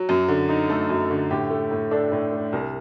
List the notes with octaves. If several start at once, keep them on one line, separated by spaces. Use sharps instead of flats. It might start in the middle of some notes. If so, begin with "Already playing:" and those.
Already playing: F#3
F#2
D3
D#4
A3 A4
F#2
D3
A2 G4
A3
A2
D4 A4
A2
A3
C2 A#4